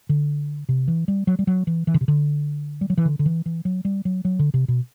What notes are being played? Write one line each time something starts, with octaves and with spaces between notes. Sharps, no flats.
D3
C3
E3
G3
F#3
G3
F#3
E3
E3
D3
C3
D3
G3
F#3
E3
D3
D3
E3
E3
F#3
G3
F#3
F#3
D3
C3
B2